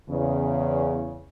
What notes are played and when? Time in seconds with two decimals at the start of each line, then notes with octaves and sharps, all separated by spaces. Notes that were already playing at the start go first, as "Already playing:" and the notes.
0.10 E2 C#3